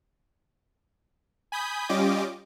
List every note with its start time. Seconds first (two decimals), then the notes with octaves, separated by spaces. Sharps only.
1.52 G#5 B5 D#6 G6
1.89 G3 C#4 F4 G4 D#5 D6